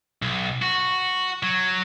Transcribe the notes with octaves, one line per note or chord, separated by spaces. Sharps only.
B1
F#4
F#3